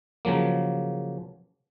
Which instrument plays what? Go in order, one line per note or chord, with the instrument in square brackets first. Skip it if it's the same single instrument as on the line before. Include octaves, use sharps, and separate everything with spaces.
[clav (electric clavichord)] C#3 F3 F#3 A#3